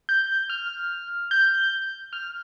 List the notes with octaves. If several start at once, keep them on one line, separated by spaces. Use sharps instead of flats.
G6
F6
G6
F6